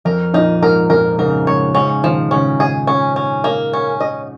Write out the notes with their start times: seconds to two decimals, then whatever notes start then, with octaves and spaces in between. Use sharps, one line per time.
0.05 F2 A#4
0.34 F2 A#2 D#4
0.62 G#2 A#4
0.90 F2 A#2 A#4
1.18 G#2 C#3 A#4
1.47 G#2 C#3 C#5
1.75 G#2 C#3 C#4
2.03 A#2 D#3 F3
2.31 G#2 C#3 C#4
2.60 G#4
2.87 C#4
3.16 C#4
3.44 A#3
3.73 C#4
4.00 D#5